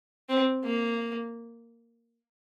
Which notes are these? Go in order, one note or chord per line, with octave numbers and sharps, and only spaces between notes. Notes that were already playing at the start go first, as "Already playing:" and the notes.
C4
A#3